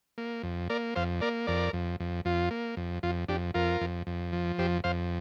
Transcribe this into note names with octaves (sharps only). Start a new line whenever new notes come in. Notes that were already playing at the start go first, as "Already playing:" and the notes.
A#3
F2
A#3 A#4 D5
F2 C5 F5
A#3 A#4 D5
F2 A#4 D5
F2
F2
F2 F4
A#3
F2
F2 F4
F2 D4 G4
F2 F4 A#4
F2
F2
F3
F2 G4 C5
F2 C5 F5